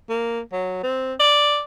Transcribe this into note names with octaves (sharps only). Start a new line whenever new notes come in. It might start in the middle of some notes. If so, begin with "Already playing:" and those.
A#3
F#3
C4
D5